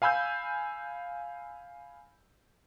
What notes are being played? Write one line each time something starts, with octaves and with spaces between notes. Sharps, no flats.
F5 G#5 B5 E6 G6